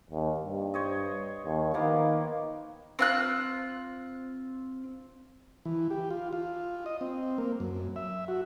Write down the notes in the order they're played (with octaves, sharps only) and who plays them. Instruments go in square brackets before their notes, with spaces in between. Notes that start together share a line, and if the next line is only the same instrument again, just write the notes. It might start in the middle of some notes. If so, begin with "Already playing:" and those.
[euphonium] D#2
G2
[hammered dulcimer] C5 C#5 D#5
[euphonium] D#2
[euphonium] D#3 [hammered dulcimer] F3 A#3 B3
[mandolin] C4 F4 F#6
[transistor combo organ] E3
G4
F4
F4
D#5
C4
A#3
F#2
E5
F#4